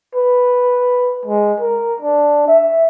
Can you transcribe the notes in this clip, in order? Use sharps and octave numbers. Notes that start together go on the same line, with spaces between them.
B4
G#3
A#4
D4
E5